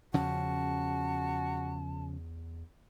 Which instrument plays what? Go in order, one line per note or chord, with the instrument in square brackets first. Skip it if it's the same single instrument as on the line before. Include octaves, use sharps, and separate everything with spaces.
[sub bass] E2 [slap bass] C#3 F3 C#4 [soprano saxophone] F#4 [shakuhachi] A5